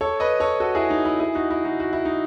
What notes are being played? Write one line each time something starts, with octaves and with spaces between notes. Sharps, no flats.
A4 C#5
B4 D#5
A4 C#5
F#4 A4
E4 G#4
D#4
E4
E4 G#4
D#4 F#4
E4
D#4 F#4
F#4
E4
D#4